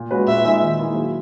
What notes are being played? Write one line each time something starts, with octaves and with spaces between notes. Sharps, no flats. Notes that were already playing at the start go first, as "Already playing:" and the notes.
Already playing: A#2
G#3 C#4 F#4 B4
A#2 E5
G#3 D#4 G#4 B4
D#3
A#3 E4 G#4
F#3